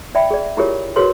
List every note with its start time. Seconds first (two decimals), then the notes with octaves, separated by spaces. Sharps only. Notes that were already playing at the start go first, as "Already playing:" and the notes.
0.15 D5 E5 G5 B5
0.31 G#4 D5
0.57 E4 F4 G4 G#4 A#4 C#5
0.96 F#4 G#4 A#4 B4 C#5 C6